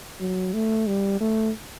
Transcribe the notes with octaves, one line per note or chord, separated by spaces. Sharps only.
F#3
A3
G3
A3